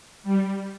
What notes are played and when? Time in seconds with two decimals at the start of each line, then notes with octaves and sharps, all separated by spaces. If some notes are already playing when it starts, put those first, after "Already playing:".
0.23 G3